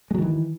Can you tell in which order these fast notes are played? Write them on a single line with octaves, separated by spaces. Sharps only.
G#3 F#3 D#3 E3